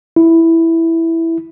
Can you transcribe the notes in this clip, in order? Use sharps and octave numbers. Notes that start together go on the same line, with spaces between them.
E4